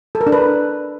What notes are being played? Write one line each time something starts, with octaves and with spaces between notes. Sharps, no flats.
A4
A#4
D4
B4